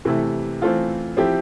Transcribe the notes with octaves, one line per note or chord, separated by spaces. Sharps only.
C3 E3 A3 E4 A4
E3 A3 C4 F4 A4
F3 C4 E4 G4